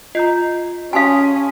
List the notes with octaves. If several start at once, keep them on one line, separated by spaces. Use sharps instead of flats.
F4 D#5 A#5 G6 C7
C#4 F#4 G4 F5 G#5 A5 C6 D#6